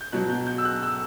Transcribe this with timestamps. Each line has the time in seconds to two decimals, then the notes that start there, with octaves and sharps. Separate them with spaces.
0.01 G6
0.12 B2 F#3 F#6
0.30 G6
0.47 G6
0.58 E6
0.65 F#6
0.83 E6